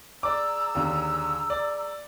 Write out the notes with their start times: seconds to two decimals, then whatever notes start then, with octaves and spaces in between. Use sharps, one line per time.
0.23 G#4 D5 A#5 D6 E6
0.75 D#2 D3
1.50 D5